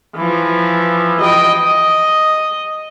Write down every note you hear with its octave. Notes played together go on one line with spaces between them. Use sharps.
E3 F3
D#5 G5
D#5